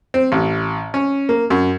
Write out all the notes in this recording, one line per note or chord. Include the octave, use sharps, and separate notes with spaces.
C4
A1
C#4
A#3
F#2